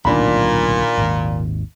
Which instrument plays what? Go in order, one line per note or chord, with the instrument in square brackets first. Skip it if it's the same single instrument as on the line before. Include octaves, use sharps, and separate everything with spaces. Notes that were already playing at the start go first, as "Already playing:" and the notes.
[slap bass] D1 B1 [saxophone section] A#2 [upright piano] D#3 D4 B5
[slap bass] G#1 D#2